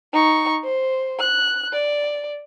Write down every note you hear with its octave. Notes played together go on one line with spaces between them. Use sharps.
D#4 C#6
C5
F#6
D5